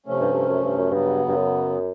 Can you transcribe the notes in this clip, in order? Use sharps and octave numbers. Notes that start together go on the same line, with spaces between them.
C3 F3 A3 C#4
G2
G2
F#2
G2
F#2
G2 C#3 F#3 B3
G2
F#2